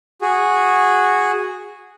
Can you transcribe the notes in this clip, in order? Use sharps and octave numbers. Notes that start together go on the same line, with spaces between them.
F#4 G#4